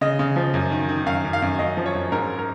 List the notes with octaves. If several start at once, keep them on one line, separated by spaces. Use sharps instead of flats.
C#3 D#5
C#3
F3
F#2
D#3
D#3
F#2 F5
F#2
F5
F#2
F#2 D#5
F3
C#5
F#2
G#2 A#4
A#4